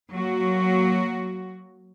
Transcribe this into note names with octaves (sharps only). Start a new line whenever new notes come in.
F#3 A#3 F#4